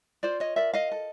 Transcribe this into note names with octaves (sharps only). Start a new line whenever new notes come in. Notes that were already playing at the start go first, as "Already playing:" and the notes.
F4 C5 D5
C#5 D#5
A#4 D5 E5
D#5 F5
A4